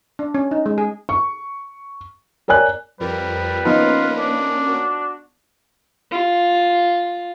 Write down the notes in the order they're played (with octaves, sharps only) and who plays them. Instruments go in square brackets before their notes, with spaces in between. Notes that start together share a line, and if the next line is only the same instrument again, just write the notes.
[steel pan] D4
C#4
D#4
G#3
G#4
[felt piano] C#6
A#4 C#5 D5 G#5 F#6
[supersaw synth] F2 F3 A#4 [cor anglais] G3 [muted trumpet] B4
[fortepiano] F3 B3 D#4 [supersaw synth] A#3 C#4 A#4 [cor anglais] F4
[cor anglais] D4
[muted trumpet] F#4
[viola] F4